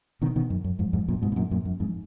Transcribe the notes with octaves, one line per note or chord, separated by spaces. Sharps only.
B2 D#3
B2 D#3
F#2
F#2
F2 G#2
F2 G#2
F#2 A#2
G#2 B2
B2
F#2 A#2
F#2 A#2
F#2
F2 G#2